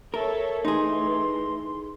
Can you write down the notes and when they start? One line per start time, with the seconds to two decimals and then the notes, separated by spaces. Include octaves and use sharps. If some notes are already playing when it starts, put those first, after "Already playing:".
0.14 A4 A#4 C#5 E5
0.65 E3 A3 D#4 G#4 C6